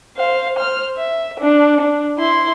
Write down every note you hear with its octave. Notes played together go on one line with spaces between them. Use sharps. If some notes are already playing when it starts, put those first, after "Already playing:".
C5 F5
C5 F6
E5
D4
D4
E4 C6